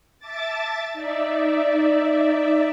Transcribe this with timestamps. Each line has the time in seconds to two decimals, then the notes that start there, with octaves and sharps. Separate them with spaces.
0.19 E5 A5 D6 A6
0.93 D#4 D5 E5